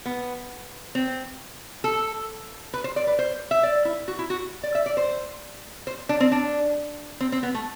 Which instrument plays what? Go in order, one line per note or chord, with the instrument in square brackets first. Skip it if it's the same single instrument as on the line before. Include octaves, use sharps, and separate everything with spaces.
[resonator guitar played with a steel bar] B3
C4
A4
B4
C5
D5
B4
C5
E5
D5
E4
F#4
E4
F#4
D5
E5
D5
C5
C5
D4
C4
D4
C4
C4
B3
A3